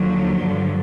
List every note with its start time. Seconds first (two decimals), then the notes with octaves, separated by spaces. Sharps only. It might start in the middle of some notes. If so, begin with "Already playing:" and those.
Already playing: D#2 D3 F3 F#3
0.42 G2 D3 F3